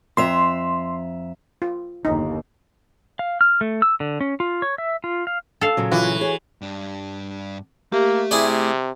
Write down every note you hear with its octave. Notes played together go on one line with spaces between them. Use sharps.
F2 E5 A#5 C6
F4
G1 D#2 D#4
F5
F6
A3
E6
D3
C#4
F4
C#5
E5
F4
F5
A4 F5
A#2 C#3 F#3
E3 F4 F#4
G#4 C#5
G2 D4
A3 A#3 G4 E5
C3 E4 G#4 D5